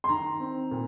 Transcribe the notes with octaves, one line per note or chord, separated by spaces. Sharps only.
C6
D#3 A#5
C4
A#2